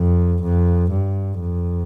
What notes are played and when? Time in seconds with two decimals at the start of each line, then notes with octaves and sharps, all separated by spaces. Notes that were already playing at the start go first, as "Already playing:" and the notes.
Already playing: F2
0.43 F2
0.92 G2
1.41 F2